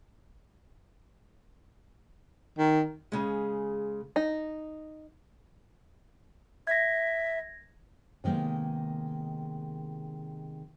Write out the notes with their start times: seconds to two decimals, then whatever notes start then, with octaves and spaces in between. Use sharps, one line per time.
2.58 D#3
3.12 C#3 G#3
4.16 D#4
6.67 E5 G#6 A#6
8.24 C3 D#3 G#3 A#3 B3